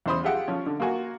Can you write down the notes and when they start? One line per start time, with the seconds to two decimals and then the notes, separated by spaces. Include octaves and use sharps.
0.06 E2 C#3 C5 B5 D#6
0.24 F4 G4 G#4 E5 F#5 G5
0.48 F3 C#4
0.66 D3
0.80 A#3 F4 F#4 G#5